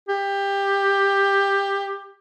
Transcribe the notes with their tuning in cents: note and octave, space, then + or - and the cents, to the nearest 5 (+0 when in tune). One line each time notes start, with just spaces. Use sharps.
G4 +15